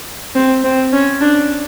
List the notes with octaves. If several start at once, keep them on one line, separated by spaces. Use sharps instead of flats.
C4
C4
C#4
D4